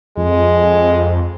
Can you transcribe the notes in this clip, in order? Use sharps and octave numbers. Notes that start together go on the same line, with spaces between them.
F2 G#3